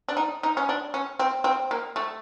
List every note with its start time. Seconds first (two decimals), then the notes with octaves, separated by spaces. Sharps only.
0.08 D4
0.17 D#4
0.43 D#4
0.57 C#4
0.69 D4
0.94 C#4
1.19 C4
1.44 C4
1.71 A#3
1.96 A3